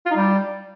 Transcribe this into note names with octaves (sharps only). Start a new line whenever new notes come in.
F4
D#4
G3